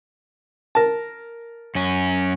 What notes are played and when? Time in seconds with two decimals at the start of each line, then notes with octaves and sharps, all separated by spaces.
0.75 A#4 A5
1.75 F#2 C#4